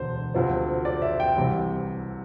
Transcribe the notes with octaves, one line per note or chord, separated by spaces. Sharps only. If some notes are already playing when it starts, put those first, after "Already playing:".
Already playing: E1 D2 D3 C5
D2 C3 F3 C4
D5
E5
G5
C2 C3 E3